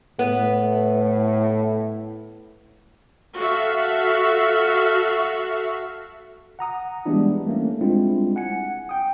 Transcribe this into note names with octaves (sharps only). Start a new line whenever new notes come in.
A2 B3
F#4 A4 E5 F5
F#5 A#5 D#6
E3 G3 G#3 B3 D4 E4
A3 A#3 C#4
G3 G#3 C4 D4 E4 F4
F#5 G#5 C#7
G5 D#6